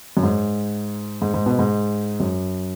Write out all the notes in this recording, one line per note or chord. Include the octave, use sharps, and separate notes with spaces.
F#2
G#2
G#2
G#2
B2
G#2
F#2